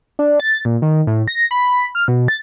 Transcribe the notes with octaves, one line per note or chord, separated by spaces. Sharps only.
D4
A6
A#2
D#3
A2
A#6
B5
F6
B2
A6